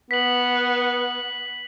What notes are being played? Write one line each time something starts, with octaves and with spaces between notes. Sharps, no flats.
B3 B6 F#7